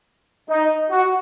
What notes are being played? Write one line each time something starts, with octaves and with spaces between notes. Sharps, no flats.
D#4
F#4